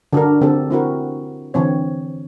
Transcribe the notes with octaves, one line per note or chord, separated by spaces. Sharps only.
D3 D4 F#4 A#4
D3 C4 D4 G4 A4
C4 E4 F#4 A#4
D3 E3 C4 C#5